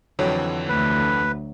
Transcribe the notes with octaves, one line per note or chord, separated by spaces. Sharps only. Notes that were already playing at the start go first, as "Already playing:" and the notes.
F2 D3 E3 F#3 G5
D2 B4